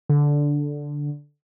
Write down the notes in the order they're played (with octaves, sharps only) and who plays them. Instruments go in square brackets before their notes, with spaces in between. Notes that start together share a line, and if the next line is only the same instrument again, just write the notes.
[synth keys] D3